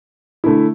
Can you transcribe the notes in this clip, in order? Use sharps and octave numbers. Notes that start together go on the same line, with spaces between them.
D3 A3 E4